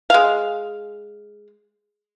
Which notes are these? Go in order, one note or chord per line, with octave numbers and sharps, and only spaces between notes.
G#3 F5